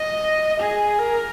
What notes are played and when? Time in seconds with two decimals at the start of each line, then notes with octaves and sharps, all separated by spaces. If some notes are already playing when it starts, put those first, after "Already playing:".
Already playing: D#5
0.60 G#4
0.99 A#4